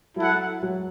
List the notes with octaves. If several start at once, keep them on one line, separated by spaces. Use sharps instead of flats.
F#3 E4 A4 F#5
F#3